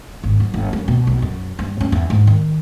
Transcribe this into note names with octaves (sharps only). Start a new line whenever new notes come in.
G#1
F#3
G1
F#2
B2
B1
F#2
G2
C#4
E2
G#2
D#3